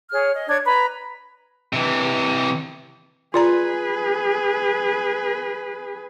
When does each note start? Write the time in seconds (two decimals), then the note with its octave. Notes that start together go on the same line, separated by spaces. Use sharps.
0.10 G#4 C#5 F6
0.32 D#5
0.47 D4 C#5 G#6
0.64 B4 A#5 B5
1.73 C3 E3
3.34 F4 G#4 B4 D5 A#5